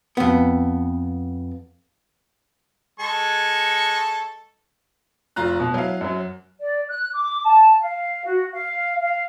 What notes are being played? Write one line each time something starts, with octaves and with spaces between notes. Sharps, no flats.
F2 B3
G#3 A4 C#6
F1 F4 A#5 F#6
B2
F#3 E4 F5
F#2 F#3
D5
F#6
D6
A5
F5
F#4
F5
F5